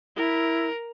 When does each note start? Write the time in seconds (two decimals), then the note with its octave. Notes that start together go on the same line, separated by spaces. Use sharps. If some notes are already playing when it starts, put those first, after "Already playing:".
0.17 E4 A#4